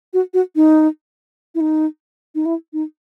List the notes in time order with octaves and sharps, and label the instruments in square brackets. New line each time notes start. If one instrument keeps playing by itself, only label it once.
[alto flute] F#4
F#4
D#4
E4
D#4
D#4
E4
D#4